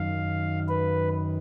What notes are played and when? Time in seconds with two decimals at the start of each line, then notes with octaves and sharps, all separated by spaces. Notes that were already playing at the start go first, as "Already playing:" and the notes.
Already playing: F#2 D#3 F5
0.69 B4